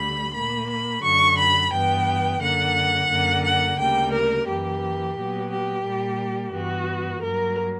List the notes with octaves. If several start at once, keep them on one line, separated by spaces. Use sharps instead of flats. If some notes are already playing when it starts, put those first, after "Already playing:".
Already playing: D2 D3 G3 B5
A#2 A#3 B5
B5
F#2 D3 F#3 C#6
B5
G2 E3 B3 G5
F#2 D3 A#3 F#5
F#2 D3 A#3
F#5
D2 C#3 G3 A#3 G5
A#4
F#2 E3 A#3 G4
A#2 F#3 B3
G4
A#2 G3 A#3
G2 E3 B3 F#4
G2 F#3 A#3 A#4